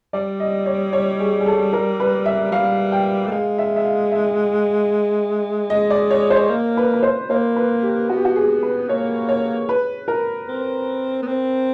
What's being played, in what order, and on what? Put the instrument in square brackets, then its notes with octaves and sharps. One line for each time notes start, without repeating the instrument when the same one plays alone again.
[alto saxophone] G3 [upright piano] D5
[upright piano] D#5
C#5
C#5
G#4
G#4
A4
A#4
B4
E5
[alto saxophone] G3 [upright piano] F5
[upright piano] G5
[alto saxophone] A3
[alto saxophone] G#3 [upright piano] F5
[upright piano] E5
E5
F5
E5
[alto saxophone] G#3 [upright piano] D#5
[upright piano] D5
C#5
C5
[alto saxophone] A#3
[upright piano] B4
B4
C5
[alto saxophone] A#3 [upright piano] C5
[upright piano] B4
G4
[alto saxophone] B3 [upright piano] F#4
[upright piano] G4
F#4
G#4
B4
[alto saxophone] A#3 [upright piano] C#5
[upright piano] C#5
B4
A#4
[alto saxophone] C4
B3
C4